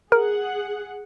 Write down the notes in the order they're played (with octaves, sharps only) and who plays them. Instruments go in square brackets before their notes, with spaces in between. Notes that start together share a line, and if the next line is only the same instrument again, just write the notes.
[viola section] G#4 F#5 [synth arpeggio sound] A#4